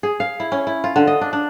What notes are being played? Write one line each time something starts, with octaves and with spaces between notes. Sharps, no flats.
G#4
F5
E4
C#4
E4
F4
D3
D#5
D4
D4